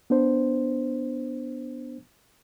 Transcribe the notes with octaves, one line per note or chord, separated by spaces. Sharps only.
B3 D4 C5